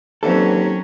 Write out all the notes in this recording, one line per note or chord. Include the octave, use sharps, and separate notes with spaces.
D#2 D3 E3 F#3 C4 C#4 A4